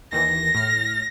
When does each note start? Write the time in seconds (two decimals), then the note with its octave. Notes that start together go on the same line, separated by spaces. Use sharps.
0.12 D#2 D#3 E3 A#6
0.55 A2 F6